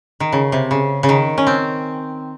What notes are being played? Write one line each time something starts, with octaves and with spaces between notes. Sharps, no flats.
D#3
C#3
C3
C#3
C#3
D#3
C#4
C4